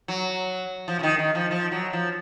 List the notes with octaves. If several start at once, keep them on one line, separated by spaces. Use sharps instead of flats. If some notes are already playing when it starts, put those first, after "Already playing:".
F#3
F3
C#3
D#3
D#3
F3
F3
F#3
F3